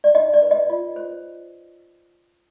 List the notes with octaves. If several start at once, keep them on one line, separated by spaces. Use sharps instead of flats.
D5
D#4 D#5
D5
B4
D#5
F4
C5